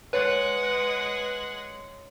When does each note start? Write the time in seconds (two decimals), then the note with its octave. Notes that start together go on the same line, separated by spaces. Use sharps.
0.13 G#3 B4 C#5 F#5